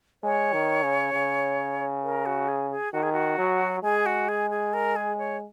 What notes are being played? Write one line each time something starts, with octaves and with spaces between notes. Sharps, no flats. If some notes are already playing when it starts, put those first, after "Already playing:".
G#3 C#5
D#3
C#3
C#3
A#4
F#4
G#4
G#4
D#3 F#4
G#4
F#4
F#3
G#3 G#4
F#4
G#4
G#4
A#4
G#4
C#5